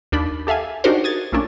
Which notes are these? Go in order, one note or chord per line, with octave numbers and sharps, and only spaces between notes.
D#2 D4 B5
G4 A4 E5 F5 G#5
D4 D#4 F#4 G4 A#4 C5
D#6 G#6 A6
A#1 A3 A#3 C#4 D4